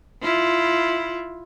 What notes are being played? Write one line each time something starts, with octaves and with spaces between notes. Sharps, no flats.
E4 F4